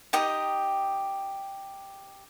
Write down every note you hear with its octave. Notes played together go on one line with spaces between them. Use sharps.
D#4 G4 G5 D#6